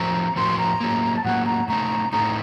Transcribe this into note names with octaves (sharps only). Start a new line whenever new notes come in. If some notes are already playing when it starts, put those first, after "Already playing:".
Already playing: A2 F3 C4 F#4 A#4 A#5
A2 F3 C4 F#4 A#4 C6
A#5
A2 F#3 A#3
A5
A2 F#3 A#3 F#5
A#5
A2 A3 C4 D#4 A#5
A2 A3 C4 D#4 A#5